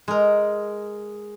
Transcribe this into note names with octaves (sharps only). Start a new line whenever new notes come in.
G#3 A#4